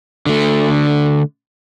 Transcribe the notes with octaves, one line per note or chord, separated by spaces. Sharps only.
D3 A3